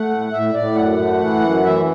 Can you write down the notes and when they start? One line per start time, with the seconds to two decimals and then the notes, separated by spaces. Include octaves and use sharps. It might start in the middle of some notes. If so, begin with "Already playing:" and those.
Already playing: A3 F#5
0.10 A2
0.32 A2 E5
0.53 A2 D5
0.75 F#2 F#5
0.98 A3
1.19 E3
1.41 F#2
1.63 E3 E5